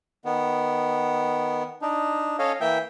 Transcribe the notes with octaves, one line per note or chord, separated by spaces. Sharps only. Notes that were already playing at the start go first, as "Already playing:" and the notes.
D#3 B3
D4 D#4
C#4 A4 C#5 D#5 F5
E3 A#3 E5 G5